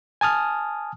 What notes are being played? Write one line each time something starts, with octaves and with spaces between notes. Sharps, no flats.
G#5 A5 D#6 F6